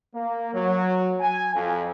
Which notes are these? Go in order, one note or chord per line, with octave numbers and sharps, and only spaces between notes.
A#3
F#3
G#5
F2